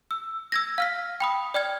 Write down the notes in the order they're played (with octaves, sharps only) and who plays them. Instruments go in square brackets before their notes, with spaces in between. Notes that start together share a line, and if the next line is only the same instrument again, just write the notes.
[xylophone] E6
E6 G#6 A#6
F5 F6 B6
G5 B5 D#6
D5 G5 F6 G#6